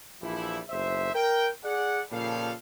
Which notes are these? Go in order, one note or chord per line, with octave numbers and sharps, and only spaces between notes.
A#1 E3 F3 G3 E4
F#1 B1 C5 E5
A#4 G5
G#4 D5 F#5
A#2 C#3 F3 G3 A4 F5